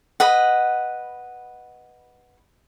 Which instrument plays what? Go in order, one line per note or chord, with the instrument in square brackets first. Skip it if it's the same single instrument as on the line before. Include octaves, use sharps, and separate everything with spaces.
[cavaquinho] B4 D#5 F#5